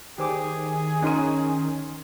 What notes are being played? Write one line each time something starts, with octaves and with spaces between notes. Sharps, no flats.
D#3 G4 G#4 C5 D6
C#4 D#4 C#5 C6 D#7